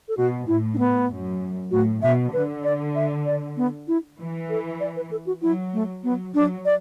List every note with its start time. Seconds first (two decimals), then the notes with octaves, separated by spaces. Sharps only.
0.08 A4
0.17 B2 F#4
0.47 A2 E4
0.74 D4
0.78 B3
1.10 F#2
1.71 A2 F#4
2.02 B2 E5
2.33 D3 B4
2.64 D5
2.95 E5
3.26 D5
3.57 B3
3.88 E4
4.19 E3
4.49 A4
4.80 D5
4.96 B4
5.11 A4
5.27 F#4
5.42 F#3 E4
5.73 A3
6.03 F#3 B3
6.34 F#3 D4
6.65 D5